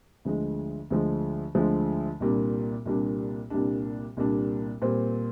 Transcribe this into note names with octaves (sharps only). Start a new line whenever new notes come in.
D2 D3 F3 G#3
D2 D3 F3 G#3
D2 D3 F3 G#3
C2 A#2 G3 D4
C2 A#2 G3 D4
C2 A#2 G3 D4
C2 A#2 G3 D4
A#2 G3 C4